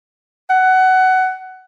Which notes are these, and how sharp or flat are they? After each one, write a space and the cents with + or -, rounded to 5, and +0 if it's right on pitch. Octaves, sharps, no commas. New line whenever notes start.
F#5 +15